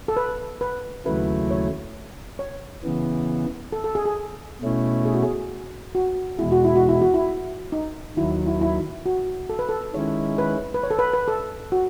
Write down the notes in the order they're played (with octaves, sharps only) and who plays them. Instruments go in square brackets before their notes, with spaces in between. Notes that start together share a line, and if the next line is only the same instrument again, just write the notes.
[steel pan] A4
B4
B4
[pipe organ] D#2 C#3 F#3 A3 E4 [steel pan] B4
[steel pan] C#5
C#5
[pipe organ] C#3 E3 B3
[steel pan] A4
A4
G#4
G#4
[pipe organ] B2 A3 C#4 E4
[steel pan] G#4
F#4
G#4
F#4
[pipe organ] E2 B2 G#3 [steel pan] E4
[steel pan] F#4
E4
F#4
E4
F#4
E4
D#4
[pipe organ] D#2 D#3 F#3 [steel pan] E4
[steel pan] E4
E4
F#4
A4
B4
A4
[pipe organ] D#3 G#3 C#4 E4 [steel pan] C#5
[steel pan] B4
B4
C#5
A4
B4
B4
A4
F#4